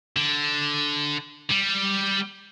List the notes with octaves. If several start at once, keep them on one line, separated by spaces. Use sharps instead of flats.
D3
G3